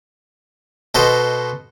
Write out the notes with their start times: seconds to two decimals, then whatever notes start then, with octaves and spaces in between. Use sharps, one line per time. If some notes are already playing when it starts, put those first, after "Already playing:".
0.95 B2 A4 C5 D#5